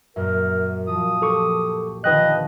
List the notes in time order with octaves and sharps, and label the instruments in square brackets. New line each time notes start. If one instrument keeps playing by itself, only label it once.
[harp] F#2 A#2 [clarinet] A#4 [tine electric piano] E5
[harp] F3 [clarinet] D#6
[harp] G4 [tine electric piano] A4 C#6 D6
[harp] D3 D#3 F3 [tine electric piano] B4 G5 F#6 [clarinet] D#5